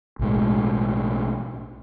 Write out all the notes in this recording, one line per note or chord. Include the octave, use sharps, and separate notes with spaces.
B1 A2 G#3